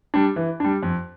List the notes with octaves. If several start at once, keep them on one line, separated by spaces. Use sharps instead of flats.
G3 D4
E3
G3 D4
F2